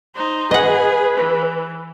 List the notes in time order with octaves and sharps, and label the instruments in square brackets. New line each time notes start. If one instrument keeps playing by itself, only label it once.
[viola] D#4 C5
[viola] G#4 G#5 [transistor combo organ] B4 [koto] D#5 F#5
[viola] E3